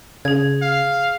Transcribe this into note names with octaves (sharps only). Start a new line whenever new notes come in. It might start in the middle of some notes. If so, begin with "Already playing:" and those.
C#3 G#4 G#6
F5